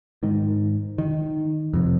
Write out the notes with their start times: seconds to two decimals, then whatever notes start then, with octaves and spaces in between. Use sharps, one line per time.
0.23 G#2 D#3
0.98 D#3
1.73 F2 C3